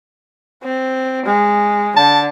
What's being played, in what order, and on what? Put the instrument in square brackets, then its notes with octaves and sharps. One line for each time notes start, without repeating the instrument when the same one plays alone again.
[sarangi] C4
G#3
[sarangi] D3 [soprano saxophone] A5